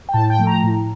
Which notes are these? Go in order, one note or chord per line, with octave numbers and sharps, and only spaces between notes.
G5
A2 A5
G5
F3 A3
A#5
A2